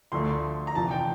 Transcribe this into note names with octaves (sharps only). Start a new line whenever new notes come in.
D2 D3 F3 A3 C6
A#5
F1 E2 C3 F3 A5
G5